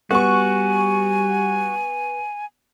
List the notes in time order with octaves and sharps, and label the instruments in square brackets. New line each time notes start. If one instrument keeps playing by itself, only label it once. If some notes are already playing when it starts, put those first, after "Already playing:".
[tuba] G3 [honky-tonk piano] B3 C#6 [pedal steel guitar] F#4 [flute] G#5